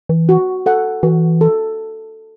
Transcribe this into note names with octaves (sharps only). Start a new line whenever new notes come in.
E3
F#4
A4 F#5
E3 F#4
A4